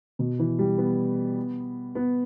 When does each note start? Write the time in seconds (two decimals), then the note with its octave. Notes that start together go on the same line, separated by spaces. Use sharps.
0.19 B2
0.39 E3
0.59 G3
0.78 B3
1.95 B3